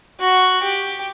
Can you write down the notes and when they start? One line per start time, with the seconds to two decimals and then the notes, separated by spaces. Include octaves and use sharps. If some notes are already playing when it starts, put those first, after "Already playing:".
0.20 F#4
0.63 G4